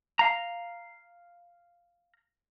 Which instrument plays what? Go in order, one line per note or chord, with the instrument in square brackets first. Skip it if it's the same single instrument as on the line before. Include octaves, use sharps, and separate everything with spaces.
[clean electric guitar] F5 A#5